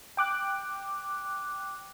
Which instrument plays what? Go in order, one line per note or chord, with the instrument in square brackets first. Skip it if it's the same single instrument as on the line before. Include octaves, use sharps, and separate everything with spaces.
[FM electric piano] G5 D6 F#6